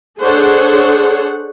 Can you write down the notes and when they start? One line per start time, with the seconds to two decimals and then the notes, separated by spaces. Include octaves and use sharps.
0.20 D4 G#4 A4 C5 C#5 F#5